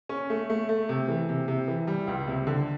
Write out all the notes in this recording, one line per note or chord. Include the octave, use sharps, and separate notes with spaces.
C#4
A3
A3
A3
C3
E3
C3
C3
E3
G3
C#2
C3
D3